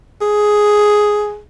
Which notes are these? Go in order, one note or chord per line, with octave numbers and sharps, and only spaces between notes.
G#4